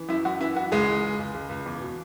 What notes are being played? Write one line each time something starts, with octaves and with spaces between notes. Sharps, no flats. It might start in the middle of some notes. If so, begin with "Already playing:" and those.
Already playing: E3
F#2 E4
F#2 F#4
E3 E4
E3 F#4
C#2 G#3 G#4
C#2
C#2
C#2
C#2
C#2
E2
B2